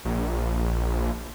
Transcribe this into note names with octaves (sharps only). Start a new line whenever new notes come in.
A#1